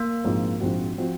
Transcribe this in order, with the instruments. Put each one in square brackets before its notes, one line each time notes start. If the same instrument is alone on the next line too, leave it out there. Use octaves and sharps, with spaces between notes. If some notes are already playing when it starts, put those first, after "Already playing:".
Already playing: [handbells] A#3
[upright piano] A#1 G#2 F3 C4 F#4
A#1 G#2 F3 C4 F#4
F3 C4 F#4